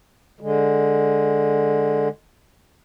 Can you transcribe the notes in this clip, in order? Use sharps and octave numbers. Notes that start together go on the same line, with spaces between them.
D3 G#3